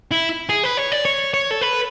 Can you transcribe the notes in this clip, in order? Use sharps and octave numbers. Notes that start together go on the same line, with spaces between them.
E4
G#4
B4
C#5
D5
C#5
C#5
A4
B4